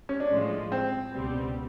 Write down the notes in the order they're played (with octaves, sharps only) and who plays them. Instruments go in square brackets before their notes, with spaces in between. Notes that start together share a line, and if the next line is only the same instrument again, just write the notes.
[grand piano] C#4
D4
[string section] A2 F3 G#3
[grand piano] C4
[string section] C#2 B2 G3 C4